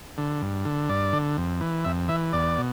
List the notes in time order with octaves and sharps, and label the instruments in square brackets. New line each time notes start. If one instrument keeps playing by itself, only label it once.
[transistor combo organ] D3
G2
D3
G2 D5
D3
F2
E3
F2 E5
E3 E5
E2 D5
B2